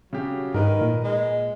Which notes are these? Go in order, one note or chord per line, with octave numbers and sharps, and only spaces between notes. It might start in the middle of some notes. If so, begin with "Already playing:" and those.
C#3 F#3 G4
G#2 D#3 A#4 B4
A#2
G#3